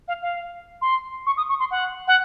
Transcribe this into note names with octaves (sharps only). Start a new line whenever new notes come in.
F5
F5
C6
C#6
D#6
C#6
C6
F#5
F#5